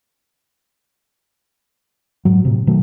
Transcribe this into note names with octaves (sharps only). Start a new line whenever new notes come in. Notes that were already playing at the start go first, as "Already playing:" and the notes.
G#2 F#3
A2 C3
B2 D#3 F#3 A3